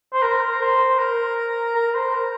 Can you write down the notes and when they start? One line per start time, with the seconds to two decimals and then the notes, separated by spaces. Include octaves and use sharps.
0.13 C5
0.22 A#4
0.61 C5
0.99 A#4
1.75 A#4
1.94 C5
2.14 A#4